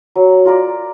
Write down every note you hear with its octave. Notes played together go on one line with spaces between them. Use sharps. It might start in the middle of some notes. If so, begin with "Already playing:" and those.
F#3
F4 A#4 D5